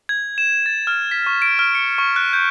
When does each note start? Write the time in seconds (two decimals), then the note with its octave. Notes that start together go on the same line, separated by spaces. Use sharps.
0.09 G#6
0.38 E7
0.66 A6
0.87 F6
1.11 B6
1.26 C#6
1.42 D7
1.59 F6
1.75 C#7
1.98 C#6
2.16 F#6
2.33 G6